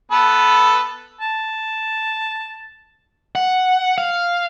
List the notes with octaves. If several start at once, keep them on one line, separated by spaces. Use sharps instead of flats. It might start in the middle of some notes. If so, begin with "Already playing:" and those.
B3 A4 B4
A5
F#5
F5